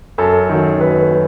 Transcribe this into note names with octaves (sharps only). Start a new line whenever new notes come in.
F#2 A4
D#3 F#3
F#2 B4
F#3